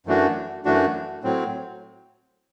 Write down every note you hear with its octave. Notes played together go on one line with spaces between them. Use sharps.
F#2 E3 A3 D4 F#4
F#2 E3 A3 D4 F#4
A2 F#3 C4